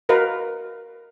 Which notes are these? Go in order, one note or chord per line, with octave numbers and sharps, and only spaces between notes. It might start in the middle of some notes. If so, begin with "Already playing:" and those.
F#4 A#4 B4 D#5 F5